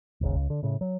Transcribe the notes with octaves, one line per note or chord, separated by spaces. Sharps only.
D#1 G#1 G#2 C#3
C#2
D3
A2 C#3
F#3